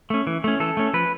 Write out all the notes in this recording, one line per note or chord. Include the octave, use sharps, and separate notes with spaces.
A3 C#4
E3
A3 C#4
E3 A4
A3 C#4
F3 B4